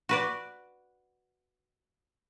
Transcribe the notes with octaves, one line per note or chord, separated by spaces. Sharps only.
F#4 B4 D5